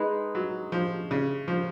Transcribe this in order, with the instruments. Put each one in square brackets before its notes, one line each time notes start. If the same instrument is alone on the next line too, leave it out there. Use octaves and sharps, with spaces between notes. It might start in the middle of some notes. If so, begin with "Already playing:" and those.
Already playing: [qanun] G#3 D#4 G#4 B4
[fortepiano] F#3
F3
C#3
F3